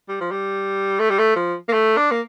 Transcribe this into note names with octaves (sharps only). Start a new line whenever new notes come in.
G3
F3
G3
A3
G3
A3
F3
A#3
A3
D4
A#3